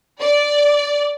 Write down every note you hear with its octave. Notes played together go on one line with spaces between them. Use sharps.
D5